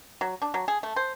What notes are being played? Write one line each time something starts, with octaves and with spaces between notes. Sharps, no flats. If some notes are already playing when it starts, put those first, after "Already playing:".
F#3
D4
F#3
G#4
A3
C5